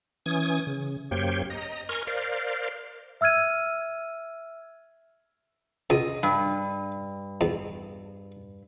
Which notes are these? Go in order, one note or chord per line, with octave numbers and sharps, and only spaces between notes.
E3 C#4 G#5 D#6 G#6
C#3
F#2 A#3 G4 C5 C#5 G5
D#5 A#5
A#4 G#5 A#5 C6 C#6 F6
A#4 C5 D5 F5
E5 E6 F6 G#6 D#7
C#2 D#5
G2
E2